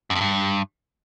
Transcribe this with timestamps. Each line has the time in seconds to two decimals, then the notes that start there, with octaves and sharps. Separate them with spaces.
0.10 F#2
0.15 F2
0.21 G2